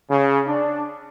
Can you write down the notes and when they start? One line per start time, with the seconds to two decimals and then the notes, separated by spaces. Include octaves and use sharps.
0.10 C#3
0.48 D4